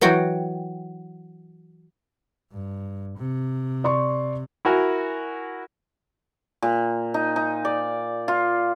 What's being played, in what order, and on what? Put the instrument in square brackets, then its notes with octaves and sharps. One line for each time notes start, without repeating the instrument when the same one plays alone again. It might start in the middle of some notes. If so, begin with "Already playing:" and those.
[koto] E3 F#3 F#4 G5
[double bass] G2
C3
[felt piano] D5 C6 C#6
[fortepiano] E4 F#4 A#4 G#5
[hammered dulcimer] A#2
D#4
D#4
D5
F4